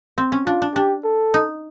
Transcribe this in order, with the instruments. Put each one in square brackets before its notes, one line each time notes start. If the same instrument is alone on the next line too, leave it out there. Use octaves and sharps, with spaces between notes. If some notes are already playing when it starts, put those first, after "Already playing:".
[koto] C4
C#4
[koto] D4 [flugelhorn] F4
[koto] D4
[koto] D4 [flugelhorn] G4
[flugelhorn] A4
[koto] D#4